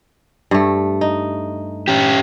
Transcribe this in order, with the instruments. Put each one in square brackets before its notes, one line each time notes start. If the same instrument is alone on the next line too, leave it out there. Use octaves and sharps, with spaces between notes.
[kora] G2 A3
D#4
[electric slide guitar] C#4 G4